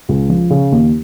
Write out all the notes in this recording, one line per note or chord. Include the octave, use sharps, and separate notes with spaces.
C#2
F3
C#3
D#2